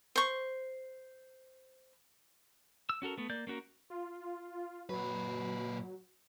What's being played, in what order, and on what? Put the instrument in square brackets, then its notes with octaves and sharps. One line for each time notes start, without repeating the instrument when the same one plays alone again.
[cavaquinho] C5 C#6
[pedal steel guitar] E6
C#4 F#4 A4 A#4
A3 B3
A#3 D5 G6
A#3 C#4 F#4 A#4
[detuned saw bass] F4
[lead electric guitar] A#2 B4 [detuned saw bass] F#3